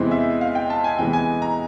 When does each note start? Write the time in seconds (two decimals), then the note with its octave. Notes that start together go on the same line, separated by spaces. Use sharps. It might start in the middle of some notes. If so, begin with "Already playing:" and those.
Already playing: E2 C3 E3 G#3 C4
0.11 E5
0.41 F5
0.55 G5
0.70 A5
0.84 G#5
0.98 E2 C3 E3 G#3 B3 G5
1.13 G#5
1.42 A#5